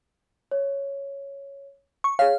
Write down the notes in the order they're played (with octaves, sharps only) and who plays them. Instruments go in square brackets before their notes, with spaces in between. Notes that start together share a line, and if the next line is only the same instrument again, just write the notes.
[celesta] C#5
[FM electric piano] C#6
[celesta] G#4 C#5 [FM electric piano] F5